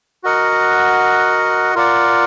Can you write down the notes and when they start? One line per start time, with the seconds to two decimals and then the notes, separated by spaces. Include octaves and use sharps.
0.23 F#4 A#4 D#5 F#5
1.75 F4 A#4 D5 F#5